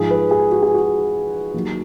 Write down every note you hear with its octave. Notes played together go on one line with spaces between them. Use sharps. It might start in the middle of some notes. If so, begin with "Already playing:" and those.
Already playing: G#2 F3 G#4
B4
G#4
F#4
G#4
F#4
D#2 D#3 F#3